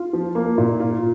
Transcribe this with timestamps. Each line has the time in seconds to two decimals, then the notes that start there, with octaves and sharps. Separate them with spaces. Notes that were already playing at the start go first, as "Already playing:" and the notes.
Already playing: F4
0.13 F3
0.35 A#3
0.58 A#2
0.80 F4